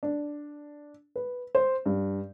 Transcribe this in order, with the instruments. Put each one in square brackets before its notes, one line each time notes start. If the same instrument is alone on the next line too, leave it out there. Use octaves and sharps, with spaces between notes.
[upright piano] D4
B4
C5
G2